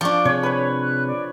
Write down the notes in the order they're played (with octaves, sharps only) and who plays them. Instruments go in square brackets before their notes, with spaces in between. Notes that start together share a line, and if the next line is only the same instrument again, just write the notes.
[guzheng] F3 D4 [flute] D5 [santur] C#6 D6
[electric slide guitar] C3 G#4 [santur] C#5
[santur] B4 B5 [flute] C#5
[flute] F#6
D5